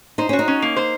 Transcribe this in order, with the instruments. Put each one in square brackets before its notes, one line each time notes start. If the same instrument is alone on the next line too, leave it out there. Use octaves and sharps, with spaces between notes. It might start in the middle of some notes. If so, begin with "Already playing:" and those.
[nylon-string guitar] D#4 [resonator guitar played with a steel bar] C5
[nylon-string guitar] C#4 [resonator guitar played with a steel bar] F#4
[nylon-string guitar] D#4
[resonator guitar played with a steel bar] C#4
A#3
C5